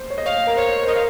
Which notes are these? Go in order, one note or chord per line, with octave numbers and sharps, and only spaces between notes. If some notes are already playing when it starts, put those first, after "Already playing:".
Already playing: C5
C#5
D#5
C#5 F5
A#4
C5 C#5
C5
A#4 D#5
F5